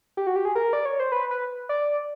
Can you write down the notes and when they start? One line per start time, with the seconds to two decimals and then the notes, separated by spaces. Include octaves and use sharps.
0.17 G4
0.27 F#4
0.36 G4
0.45 G#4
0.55 A#4
0.73 D5
0.85 C#5
1.00 C5
1.12 B4
1.31 B4
1.69 D5